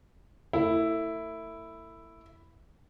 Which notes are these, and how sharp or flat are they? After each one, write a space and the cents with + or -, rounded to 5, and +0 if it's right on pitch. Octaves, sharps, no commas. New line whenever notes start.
A3 +40 E4 +0